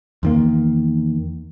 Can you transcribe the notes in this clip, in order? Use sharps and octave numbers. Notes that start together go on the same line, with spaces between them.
E2 D#3 A#3